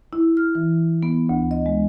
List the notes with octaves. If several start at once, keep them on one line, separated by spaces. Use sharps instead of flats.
E4
F6
E3
B3
D2
D#5
G#3